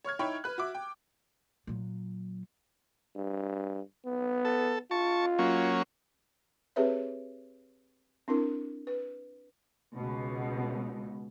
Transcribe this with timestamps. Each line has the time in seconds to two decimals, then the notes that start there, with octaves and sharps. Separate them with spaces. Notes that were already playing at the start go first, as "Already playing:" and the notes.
0.05 C#5 C#6 F6 G#6
0.19 D#4 E4 C#5 G5 B5 C#6
0.44 B4 F#6
0.58 F#4 E5 D6
0.75 G5
1.67 A#2 F#3
3.16 G2
4.06 B3
4.45 A4
4.91 F4 A5 C#6
5.39 F#3 A#3 C#4
6.76 C4 G4 G#4 B4 C#5 E5
8.28 C4 D4 E4 A#4
8.87 B4
9.95 C#2 B2